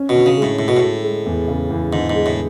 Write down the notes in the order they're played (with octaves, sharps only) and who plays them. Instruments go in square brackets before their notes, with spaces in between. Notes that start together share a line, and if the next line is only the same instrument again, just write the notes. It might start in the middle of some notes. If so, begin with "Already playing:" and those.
Already playing: [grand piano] C#4
[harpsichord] B2
[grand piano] D3
[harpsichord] C#3
[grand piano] G#3
[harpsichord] A2
[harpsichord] A2 [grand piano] A4
[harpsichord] B2
A2
[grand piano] A4
G#3
E2
C#3
E2
[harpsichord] G#2 [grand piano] D3
[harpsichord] G#2
[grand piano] G#3
[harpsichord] A2